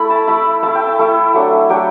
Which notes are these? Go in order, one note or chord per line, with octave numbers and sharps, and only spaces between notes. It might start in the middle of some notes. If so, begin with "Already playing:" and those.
Already playing: A3 E4 B5
A5
A3 E4 B5
A3 E4 A5
G5
A5
A3 E4
F#3 A3 D4
F#3 A3 D4 G5